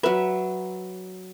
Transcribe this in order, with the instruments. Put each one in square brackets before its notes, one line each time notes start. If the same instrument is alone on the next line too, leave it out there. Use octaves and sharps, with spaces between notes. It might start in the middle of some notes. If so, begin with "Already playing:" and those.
[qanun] F#3 E5 [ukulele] B4